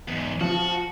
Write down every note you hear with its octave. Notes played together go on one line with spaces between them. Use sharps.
E2 G#2
F3 F#4